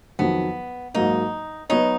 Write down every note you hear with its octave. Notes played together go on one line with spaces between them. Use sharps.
F2 D#3 F#3 B3
G#2 F#3 A#3 D#4
F#3 B3 D#4 F#4 C#5